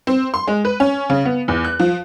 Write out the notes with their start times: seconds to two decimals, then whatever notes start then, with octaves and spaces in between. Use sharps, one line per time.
0.07 C4
0.34 C6
0.47 G#3
0.65 B4
0.80 C#4
1.10 C#3
1.25 B3
1.48 E2
1.64 F#6
1.79 F3